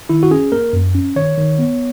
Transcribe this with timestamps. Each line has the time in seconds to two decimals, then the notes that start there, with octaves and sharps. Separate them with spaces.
0.09 D#3 E4
0.23 F#4
0.31 C#4 G#4
0.52 A#3 A#4
0.73 F#2
0.95 C#4
1.16 D#3 C#5
1.38 D#3
1.59 B3